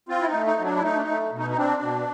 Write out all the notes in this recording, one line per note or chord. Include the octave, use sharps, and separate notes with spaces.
C4 F4
E4
D#4
A3
D#4
F#3
D4
E4
A3 D#4
D4
D#4
A3
B2
D#4
D#4
C4 D4
B2